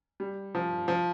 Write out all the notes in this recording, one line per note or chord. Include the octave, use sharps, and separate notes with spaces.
G3
F3
F3